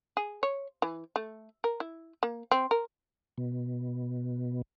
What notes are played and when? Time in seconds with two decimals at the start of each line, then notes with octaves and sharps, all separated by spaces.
0.17 G#4
0.43 C#5
0.82 E3
1.16 A3
1.64 A#4
1.80 E4
2.23 A#3
2.51 C4
2.71 A#4
3.38 B2